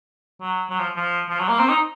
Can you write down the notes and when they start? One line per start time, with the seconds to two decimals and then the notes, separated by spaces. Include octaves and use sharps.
0.42 F#3
0.70 F#3
0.79 F3
0.96 F3
1.30 F3
1.40 F#3
1.49 A#3
1.59 C4
1.69 D#4